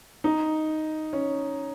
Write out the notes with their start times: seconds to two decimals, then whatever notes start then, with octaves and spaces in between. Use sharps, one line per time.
0.24 D#4
1.13 C#4